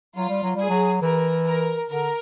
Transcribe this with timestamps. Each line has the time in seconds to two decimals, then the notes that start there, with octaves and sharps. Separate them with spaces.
0.16 F#3 F4
0.30 G3
0.43 F#3
0.56 G3 G#4
0.69 F#3
1.02 E3 A#4
1.46 A#4
1.90 D3 A#4